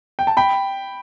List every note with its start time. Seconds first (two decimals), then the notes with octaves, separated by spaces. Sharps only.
0.19 G5
0.27 A5
0.37 G5 B5